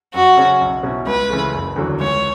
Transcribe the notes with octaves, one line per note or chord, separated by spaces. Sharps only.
F#2 F#4
C#3 F#3 C#4
B1
B2 F#3 C#4 E4
C#2 B4
C#3 E3 A3
F#1
E2 D3 F#3
C#2 C#5